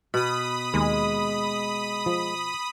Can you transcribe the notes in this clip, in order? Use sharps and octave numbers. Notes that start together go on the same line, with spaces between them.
B2 B5 D#6
D#2 G#3
F3